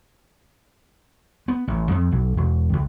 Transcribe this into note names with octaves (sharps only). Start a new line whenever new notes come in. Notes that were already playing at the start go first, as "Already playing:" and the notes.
B3
A1
F2
B1
E1
C#2